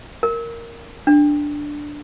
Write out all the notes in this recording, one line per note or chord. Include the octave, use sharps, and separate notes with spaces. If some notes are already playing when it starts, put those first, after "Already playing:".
A#4
D4